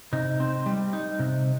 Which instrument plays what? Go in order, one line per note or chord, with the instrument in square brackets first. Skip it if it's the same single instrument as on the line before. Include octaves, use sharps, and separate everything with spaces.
[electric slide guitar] C3 D#4
C4
G3
D#4
C3